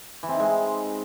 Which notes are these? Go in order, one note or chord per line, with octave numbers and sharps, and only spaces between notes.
E3
C4
D#4
G#3